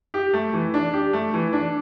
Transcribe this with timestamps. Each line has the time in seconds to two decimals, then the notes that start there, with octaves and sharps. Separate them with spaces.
0.14 G4
0.33 A3
0.53 E3
0.74 D4
0.93 G4
1.13 A3
1.34 E3
1.53 D4